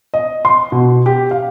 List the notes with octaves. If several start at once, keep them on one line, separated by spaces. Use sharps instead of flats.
D#5
C6
B2
G4
F5